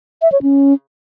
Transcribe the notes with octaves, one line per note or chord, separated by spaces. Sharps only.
E5
C#5
C#4